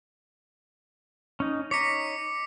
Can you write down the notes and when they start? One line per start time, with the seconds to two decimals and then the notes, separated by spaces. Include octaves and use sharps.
1.40 C#4 D#4
1.71 D#4 C#5 D6 B6 C#7